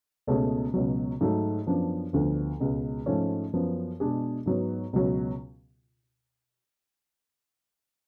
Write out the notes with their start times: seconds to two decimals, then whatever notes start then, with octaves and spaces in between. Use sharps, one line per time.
0.27 C#2 B2 A3 C#4 G#4
0.74 C#2 B2 F#3
1.21 G#2 F#3 A3
1.67 F#2 F3 B3 D4
2.13 D2 D3 F3 B3
2.60 C#2 B2 G#3
3.06 G#2 F3 A3 C#4
3.53 F#2 F3 B3
4.00 B2 G#3 D4 G#4
4.46 G#2 F#3 B3
4.93 C#2 B2 F#3